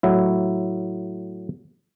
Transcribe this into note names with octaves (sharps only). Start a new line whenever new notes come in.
A2 F#3 E4